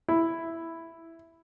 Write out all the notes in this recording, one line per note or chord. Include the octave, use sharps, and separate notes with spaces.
E4